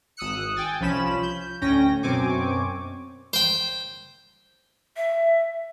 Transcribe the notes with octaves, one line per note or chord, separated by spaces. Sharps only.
G#1 D#6 E6 F#6 C#7
G5 G#5 A6
C2 F3 C#4 B5 E7
G6
D2 A2 C#4 G5 A#6
F#2 B2 C4 G#5 C#6 D6
C5 G5
E5